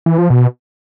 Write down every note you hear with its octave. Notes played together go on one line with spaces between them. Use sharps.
E3
F3
B2